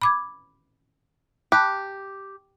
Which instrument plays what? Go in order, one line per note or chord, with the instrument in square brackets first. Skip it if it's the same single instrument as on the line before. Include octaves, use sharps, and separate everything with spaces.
[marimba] B5 D6 G#6
[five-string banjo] G4 [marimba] A5 B5 F#6